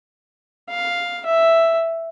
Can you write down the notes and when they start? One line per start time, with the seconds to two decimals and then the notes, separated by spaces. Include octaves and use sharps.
0.70 F5
1.26 E5